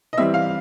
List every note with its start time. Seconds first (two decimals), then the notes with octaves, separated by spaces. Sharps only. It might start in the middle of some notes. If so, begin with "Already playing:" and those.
0.13 D#5
0.18 E3 G3 C4 E5
0.34 F5